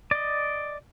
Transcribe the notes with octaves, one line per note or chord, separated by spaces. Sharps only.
D5 D#5